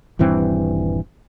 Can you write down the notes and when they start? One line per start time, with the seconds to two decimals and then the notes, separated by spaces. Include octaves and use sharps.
0.19 D#1 G2 E3 C4